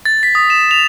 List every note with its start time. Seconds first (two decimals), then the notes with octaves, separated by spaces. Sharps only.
0.05 A6
0.23 B6
0.35 D#6
0.50 E7
0.71 F7